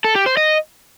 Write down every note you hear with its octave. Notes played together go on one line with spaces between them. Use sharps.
A4
G4
C5
D#5